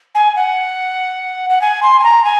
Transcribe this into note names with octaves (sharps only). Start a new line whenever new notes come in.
G#5
F#5
F#5
G#5
C6
G#5
A#5
G#5